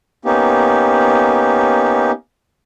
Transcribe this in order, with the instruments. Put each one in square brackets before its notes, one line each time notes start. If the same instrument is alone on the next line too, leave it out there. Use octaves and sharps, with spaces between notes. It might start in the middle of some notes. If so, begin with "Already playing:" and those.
[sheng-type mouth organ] A#3 B3 C#4 D#4 G4